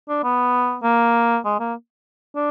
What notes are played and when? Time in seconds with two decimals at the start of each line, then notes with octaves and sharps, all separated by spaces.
0.08 D4
0.23 B3
0.83 A#3
1.45 G#3
1.60 A#3
2.36 D4